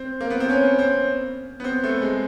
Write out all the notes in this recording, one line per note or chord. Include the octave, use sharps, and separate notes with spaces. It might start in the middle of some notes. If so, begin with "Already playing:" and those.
Already playing: C4
A#3
B3
C4
C#4
C4
B3
C4
A3
G#3